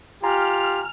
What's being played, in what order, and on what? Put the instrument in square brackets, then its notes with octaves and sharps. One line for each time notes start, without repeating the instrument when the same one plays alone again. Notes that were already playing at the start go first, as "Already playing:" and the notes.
[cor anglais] F4 [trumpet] G4 [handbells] G#5 A#5 [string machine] F6